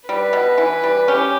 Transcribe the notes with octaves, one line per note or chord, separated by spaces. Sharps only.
G3 B4
B2
E3
G3
C#4 G4